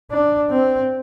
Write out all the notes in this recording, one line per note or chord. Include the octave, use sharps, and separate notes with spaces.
D4
C4